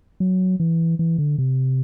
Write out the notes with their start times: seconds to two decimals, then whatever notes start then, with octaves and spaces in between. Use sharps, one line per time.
0.20 F#3
0.60 E3
0.99 E3
1.18 D3
1.38 C3